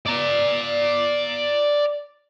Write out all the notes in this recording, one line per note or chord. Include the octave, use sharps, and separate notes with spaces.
D5 A#5